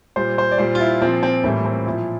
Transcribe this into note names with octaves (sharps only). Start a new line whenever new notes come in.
A#2 G3 C5
C5
D5
A#2 G3 C5
F4
E4
A#2 F3 C4
C4
A2 E3 G3 A#3
C4
A#2 F3 E4